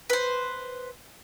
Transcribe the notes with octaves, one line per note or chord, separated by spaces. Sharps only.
B4 C5